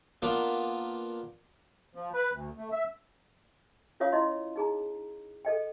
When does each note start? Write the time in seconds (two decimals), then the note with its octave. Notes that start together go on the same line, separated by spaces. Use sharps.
0.22 A#3 B3 D4 F4
1.95 F3
2.14 B4
2.32 D2
2.57 A3
2.72 E5
4.00 C#4 F4 C#5 F5 D#6
4.12 E4 D#5 C6
4.56 D#4 G#4 A#5
5.45 A4 D#5 G5